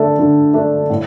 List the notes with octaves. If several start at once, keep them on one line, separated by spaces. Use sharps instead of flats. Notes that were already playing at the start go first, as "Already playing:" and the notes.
Already playing: D3 A3 D4 A4
D3
A3 D4 A4
A2